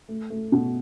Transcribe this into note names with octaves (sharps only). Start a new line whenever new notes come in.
A3
A3
B2